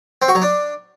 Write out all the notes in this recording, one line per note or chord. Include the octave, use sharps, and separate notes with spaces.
C4
F#4
F#3
D4